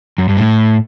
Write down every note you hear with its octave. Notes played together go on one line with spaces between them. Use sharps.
F#2
G2
A2